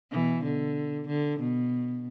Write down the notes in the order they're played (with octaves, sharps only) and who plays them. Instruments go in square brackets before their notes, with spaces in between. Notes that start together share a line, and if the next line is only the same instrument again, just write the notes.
[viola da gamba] B2 E3
D3
D3
B2